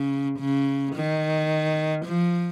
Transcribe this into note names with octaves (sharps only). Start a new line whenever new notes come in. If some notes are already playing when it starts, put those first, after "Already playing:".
Already playing: C#3
C#3
D#3
F3